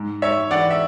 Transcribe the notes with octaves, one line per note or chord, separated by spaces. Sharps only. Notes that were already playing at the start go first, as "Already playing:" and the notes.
Already playing: G#2
G#2 C#5 E5
E3 D5 F#5
E5